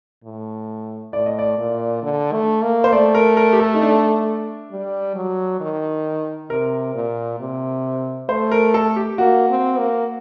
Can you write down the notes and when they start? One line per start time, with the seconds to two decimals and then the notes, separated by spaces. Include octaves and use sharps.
0.24 A2
1.13 A2 D5
1.26 D#5
1.39 D5
1.58 A#2
2.02 D3
2.33 A3
2.62 A#3
2.84 C5
2.93 A3 D5
3.15 A#4
3.37 A#4
3.53 G4
3.60 A4
3.74 D#4
3.82 D4
4.71 G3
5.16 F#3
5.60 D#3
6.50 C3 A#4
6.95 A#2
7.40 C3
8.29 A3 C5
8.51 A#4
8.74 A4
8.96 G4
9.18 A#3 F#4
9.49 C4
9.78 A#3